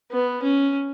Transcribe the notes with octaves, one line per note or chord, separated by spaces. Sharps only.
B3
C#4